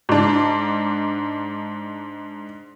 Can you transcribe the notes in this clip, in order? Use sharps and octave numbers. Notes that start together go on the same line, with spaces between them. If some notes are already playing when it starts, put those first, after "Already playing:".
G#2 D4